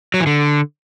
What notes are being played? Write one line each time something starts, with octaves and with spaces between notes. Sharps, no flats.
F#3
E3
D3